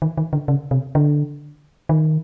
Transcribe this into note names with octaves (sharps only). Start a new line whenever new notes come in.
D#3
D#3
D3
C#3
C3
D3
D#3